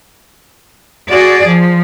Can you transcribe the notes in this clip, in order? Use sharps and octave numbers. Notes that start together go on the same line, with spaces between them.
F#4 G#4 D5
F3